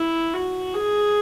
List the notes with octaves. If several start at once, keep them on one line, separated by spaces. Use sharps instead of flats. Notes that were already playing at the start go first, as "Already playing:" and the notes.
Already playing: E4
F#4
G#4